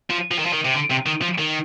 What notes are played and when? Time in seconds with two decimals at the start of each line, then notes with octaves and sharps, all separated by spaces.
0.10 F3
0.32 F3
0.39 D#3
0.46 F3
0.53 D#3
0.65 C3
0.74 D3
0.91 C3
1.06 D#3
1.22 F3
1.38 D#3